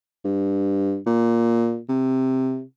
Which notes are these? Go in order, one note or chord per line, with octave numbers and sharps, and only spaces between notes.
G2
A#2
C3